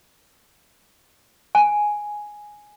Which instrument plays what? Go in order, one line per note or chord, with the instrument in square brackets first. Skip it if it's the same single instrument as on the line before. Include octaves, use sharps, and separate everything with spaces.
[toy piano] G#5